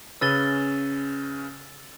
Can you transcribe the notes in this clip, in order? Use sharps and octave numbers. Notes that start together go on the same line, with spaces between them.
C#3 C#4 B4 E6 A6 G7